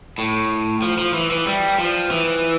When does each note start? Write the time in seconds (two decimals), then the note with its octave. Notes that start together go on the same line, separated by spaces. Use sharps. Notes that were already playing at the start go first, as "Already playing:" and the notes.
0.18 A2
0.82 F3
0.98 F3
1.14 E3
1.31 E3
1.46 G3
1.79 F3
2.11 E3